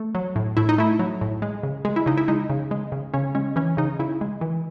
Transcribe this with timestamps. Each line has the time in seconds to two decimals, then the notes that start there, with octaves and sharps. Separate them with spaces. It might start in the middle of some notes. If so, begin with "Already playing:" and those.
Already playing: A3
0.15 F#3
0.36 A2
0.57 A2 E4
0.69 D#4
0.78 A3 E4
0.99 F#3
1.21 A2
1.42 G#3
1.63 C#3
1.85 G#3 G#4
1.96 E4
2.06 C#3 D#4
2.17 E4
2.28 G#3 D#4
2.50 C#3
2.71 G#3
2.92 C#3
3.14 C#3 C#4
3.35 G#3 C#4
3.56 E3 C#4
3.77 C#3 D#4
3.99 C#3 E4
4.21 G#3
4.41 E3